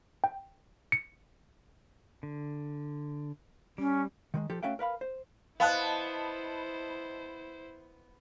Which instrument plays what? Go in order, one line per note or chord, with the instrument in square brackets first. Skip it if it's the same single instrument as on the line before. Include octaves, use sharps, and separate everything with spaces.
[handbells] G5
C#7
[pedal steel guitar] D3
[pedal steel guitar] G3 [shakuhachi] C#4
[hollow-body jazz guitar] D#3 F3 G#3
F3 G4 A4
A3 C#4 F#4 E5 F5 G5
A#4 B4 F5 B5
C5
[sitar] B3 [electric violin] E4 C5 [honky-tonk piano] D#5 A5 B5 [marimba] F5 F#6